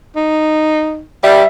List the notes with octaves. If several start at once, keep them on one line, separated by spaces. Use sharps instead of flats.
D#4
G3 E5